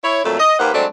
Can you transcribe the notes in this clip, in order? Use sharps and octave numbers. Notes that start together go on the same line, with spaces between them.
E4 C#5
F2 A#2 F#3 A3
D#5
D#2 A#3 G4 B4 C5 F#5
F#3 G#3 A3 C4 D4